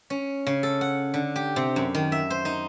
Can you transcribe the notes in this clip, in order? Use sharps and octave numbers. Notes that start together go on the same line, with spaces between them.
C#4
C#3
A4
F#5
D3
G4
C3
F#2
D#3
E5
C5
D#4